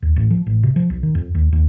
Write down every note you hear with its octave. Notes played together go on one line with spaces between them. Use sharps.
D#2
A1
F3
A1
C3
F3
B1
D#3
F2
D#2
D#2